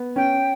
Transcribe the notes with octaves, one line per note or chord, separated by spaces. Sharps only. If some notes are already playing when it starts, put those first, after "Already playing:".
Already playing: B3
C#4 G5